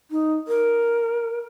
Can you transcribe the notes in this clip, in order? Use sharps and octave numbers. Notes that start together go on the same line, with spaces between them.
D#4
A#4